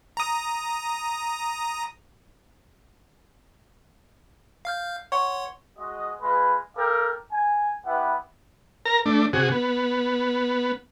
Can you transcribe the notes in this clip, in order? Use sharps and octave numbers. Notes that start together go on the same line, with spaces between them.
A#5 D#6
F5 F6 G6
C#5 F#5 C6 C#6
G#3 F#4 D#5
G#3 F4 B4
A4 A#4 F5 G5 D6
G#5
B3 E4 G4 B4 F#5
A#4 A#5
A3 D4
C3 F#4 G#4
B3